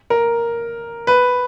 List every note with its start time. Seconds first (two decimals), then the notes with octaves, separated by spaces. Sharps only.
0.10 A#4
1.07 B4